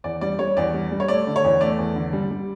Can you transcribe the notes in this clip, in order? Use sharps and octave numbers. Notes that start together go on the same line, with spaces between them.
E2 D5
G3 D5
G3 C#5
E2 D5
G3
G3
C#5
A3 D5
D3
C#5
E2
A3 D5
E2
D3
G3
G3